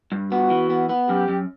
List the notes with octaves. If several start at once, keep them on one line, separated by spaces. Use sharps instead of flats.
G2
B3 F#4
E3
B3
B3
F#2 G4
F#2